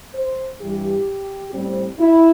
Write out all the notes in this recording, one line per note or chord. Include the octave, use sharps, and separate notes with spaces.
C5
G2 E3 G3 G4
A2 G3 C4
E4